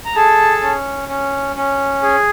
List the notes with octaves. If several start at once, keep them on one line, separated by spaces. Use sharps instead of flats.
A#5
G#4 A4 A5
C#4
C#4
C#4
G#4